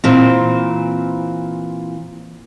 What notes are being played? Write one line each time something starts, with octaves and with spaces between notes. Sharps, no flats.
A#2 E3 C4